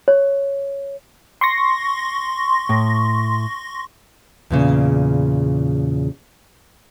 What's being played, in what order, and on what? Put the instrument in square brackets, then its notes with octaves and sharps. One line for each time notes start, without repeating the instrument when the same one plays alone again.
[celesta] C#5
[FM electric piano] C6 C#6 A#6
[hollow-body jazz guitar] A2
[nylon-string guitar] E2 A#2 C#3